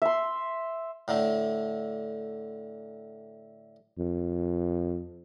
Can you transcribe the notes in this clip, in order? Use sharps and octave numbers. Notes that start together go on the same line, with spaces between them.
E5 C6
A2 D3 A3
F2